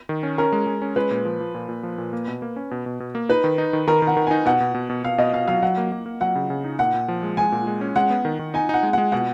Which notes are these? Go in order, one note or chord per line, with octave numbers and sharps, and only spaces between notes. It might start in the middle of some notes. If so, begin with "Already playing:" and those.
D#3
C#4
C#4 A#4
G#3
G#3
C#4
G#3 B4
A#2
F3
F3
A#2
A#2
F3
A#2
A#3
B2
A#3
C#4
B2
B2
B2
A#3
D#4 B4
D#3
D#4
D#3
D#3 A#4
D#3
F#5
D#3
D#4 G#5
B2 F#5
B2
B2
B2
B2 F5
B2 D#5
B2 F5
F#3 F5
F#3 F#5
A#3
A#3
A#3
F#3 F#5
C#3
C#3
D#4
A#2 F#5
A#2
F3
G#3
G#3 G#5
A#2
G#3
C#4
G#3 F#5
B3
D#3
D#3
D#4 G#5
D#4 F#5
G#3
G#3 F#5
B2 F#5